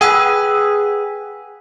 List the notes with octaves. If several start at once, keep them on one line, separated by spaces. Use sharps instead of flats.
G#4 B4 F#5 G5 E6